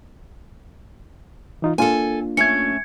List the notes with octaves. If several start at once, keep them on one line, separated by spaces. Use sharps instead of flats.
E3 D#4 F4
A#3 D4 F4 A4 G#5
A3 C#4 G#6 C#7